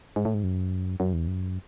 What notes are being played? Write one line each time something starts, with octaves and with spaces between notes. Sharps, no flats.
G#2
A2
G#2
F#2
F#2
E2
F#2